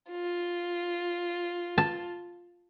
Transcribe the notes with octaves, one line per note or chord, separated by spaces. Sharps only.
F4
A5